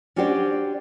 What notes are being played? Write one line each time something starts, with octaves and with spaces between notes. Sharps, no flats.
C#4 D4 F#4 G4 C5 D5